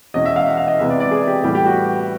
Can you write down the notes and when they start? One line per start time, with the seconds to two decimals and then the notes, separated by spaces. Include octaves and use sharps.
0.14 E2 B2 G#3 C#4 D#5
0.26 E5
0.36 F5
0.48 F#5
0.57 F5
0.68 D#5
0.79 C3 E3 G#3 B3 E5
0.90 D5
1.00 D5
1.11 G#4
1.27 G4
1.43 A2 E3 G3 B3 G4
1.55 G4
1.66 F#4